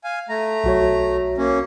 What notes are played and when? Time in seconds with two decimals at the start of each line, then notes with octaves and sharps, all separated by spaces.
0.04 F5 G#5
0.29 A3 A#5
0.64 B1 F#4 C#5
1.38 A#3 C#4